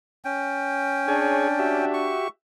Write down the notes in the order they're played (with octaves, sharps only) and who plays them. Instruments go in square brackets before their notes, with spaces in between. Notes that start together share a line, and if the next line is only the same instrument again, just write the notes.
[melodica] C#4 G5
[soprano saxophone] D4 [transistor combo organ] G#4 C#5 G#5
[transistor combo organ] F#4 G4 E5
[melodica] C#6